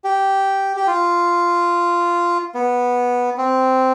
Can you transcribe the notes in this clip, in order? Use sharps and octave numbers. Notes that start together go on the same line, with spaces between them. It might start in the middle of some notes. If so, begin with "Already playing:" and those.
G4
G4
F4
B3
C4